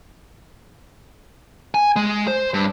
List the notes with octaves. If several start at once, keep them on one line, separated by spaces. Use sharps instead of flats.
G#5
G#3
C5
G2